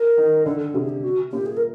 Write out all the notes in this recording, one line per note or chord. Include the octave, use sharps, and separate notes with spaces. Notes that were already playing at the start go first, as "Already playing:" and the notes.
Already playing: A#4
D#3
D3 A4
A4
C3 G#4
G4
F#4
A#2 G4
G#4
A#4